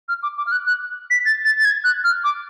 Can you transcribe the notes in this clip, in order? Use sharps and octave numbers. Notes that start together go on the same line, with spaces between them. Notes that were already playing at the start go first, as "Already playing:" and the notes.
F6
D6
D6
F6
F#6
F#6
B6
A6
A6
A6
G#6
F#6
F6
D6